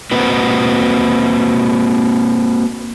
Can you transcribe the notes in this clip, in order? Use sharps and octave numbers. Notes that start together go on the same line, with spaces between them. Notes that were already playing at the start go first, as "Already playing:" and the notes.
A#3 C4 F#4 B4